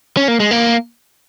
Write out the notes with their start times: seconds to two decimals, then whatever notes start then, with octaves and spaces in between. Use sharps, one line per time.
0.17 C#4
0.28 A#3
0.40 G#3
0.51 A#3